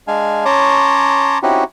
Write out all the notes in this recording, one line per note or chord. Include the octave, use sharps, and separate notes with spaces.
G#3 D4 F5 G#5
C#4 C#5 A5 A#5 C6 D6
C4 C#4 D#4 E4 F#4 G4